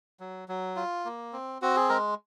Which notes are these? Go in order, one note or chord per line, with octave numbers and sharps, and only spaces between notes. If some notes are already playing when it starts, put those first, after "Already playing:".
F#3
F#3
F4
A#3
C4
C4 F#4
G#4
G#3 A#4